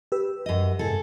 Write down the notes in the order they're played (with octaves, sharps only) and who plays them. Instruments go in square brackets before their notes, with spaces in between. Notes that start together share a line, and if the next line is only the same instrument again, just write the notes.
[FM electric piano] G4 B4 E6
[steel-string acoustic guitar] F#2 D#5
[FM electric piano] G#2 C3 [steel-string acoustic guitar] G#4 A4